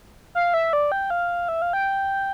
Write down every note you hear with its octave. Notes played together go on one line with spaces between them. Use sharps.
F5
E5
D5
G5
F5
E5
F5
G5